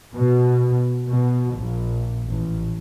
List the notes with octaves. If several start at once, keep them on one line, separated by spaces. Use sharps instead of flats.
B2
B2
A#1
A1